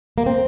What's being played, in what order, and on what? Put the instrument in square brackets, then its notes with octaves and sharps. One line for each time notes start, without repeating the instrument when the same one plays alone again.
[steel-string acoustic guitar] A#3
C4